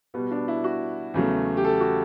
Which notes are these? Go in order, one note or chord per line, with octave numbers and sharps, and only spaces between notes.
B2 G3 B3
D4
E4
F#4
E2 C#3 F#3 A3
G4
A4
F#4